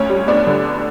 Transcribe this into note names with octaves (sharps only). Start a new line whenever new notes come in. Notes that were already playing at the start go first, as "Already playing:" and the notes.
Already playing: D2 C#4 C#5
G3
B3 D4 D5
D3